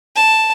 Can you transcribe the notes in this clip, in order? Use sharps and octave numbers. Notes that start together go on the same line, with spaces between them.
A5